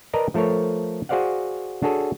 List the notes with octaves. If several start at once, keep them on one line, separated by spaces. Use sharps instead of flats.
A#4 B4 D5 D#5 A5 A#5
F3 A3 A4 A#4 C#5
F#4 G#4 C5 D5 F5 F#5
D4 F#4 G#4 A4 C#5